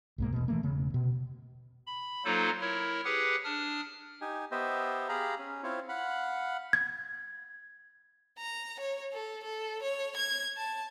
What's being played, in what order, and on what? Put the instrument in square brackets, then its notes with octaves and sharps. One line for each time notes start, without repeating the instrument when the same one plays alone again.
[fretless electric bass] B1 G#2 A#3
E1 B2
E3 A3 A#3
E1 C#3
B2
[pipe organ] B5
F#3 A#3 D#4 F4 A4 C5
E4 A#4 C#5
G4 G#4 B4 F#5
D4 D#6 F6
[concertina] D#4 G4 G#5
B3 G4 C5 D#5 E5
G4 G#4 F5 A#5 B5
C#4
C4 E4 F4 C#5
F5 F#5 B5
[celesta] G#6
[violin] A#5
C#5
A4
A4
C#5
G#6
A5